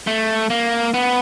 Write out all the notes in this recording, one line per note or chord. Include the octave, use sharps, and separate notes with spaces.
A3
A#3
B3